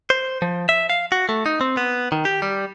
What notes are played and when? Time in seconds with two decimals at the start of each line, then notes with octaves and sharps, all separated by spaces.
0.10 C5
0.42 F3
0.69 E5
0.90 F5
1.12 F#4
1.29 A3
1.46 D#4
1.61 C4
1.77 B3
2.12 D#3
2.25 G4
2.42 G3